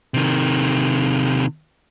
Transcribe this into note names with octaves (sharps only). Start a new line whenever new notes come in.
C3 D#3